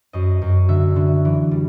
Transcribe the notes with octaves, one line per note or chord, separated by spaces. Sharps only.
F#2 D#5
F#2
D3 E5
D3
E3
G3